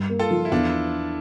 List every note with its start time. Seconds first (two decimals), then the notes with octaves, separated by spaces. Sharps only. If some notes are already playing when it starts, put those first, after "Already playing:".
Already playing: G2
0.10 A#3
0.19 F4 A4
0.30 F3
0.45 E4
0.52 E2 D4 F4